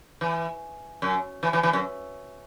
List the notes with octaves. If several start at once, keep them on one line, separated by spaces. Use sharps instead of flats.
E3
F#2
E3
E3
E3
F#2